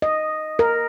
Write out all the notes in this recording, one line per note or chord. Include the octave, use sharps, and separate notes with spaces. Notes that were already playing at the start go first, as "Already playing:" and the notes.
D#5
A#4